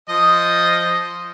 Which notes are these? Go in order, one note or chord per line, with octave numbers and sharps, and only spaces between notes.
F3 D#5 D#6